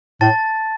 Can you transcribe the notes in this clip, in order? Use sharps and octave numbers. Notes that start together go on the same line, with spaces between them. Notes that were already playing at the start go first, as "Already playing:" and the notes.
A2 A5 A6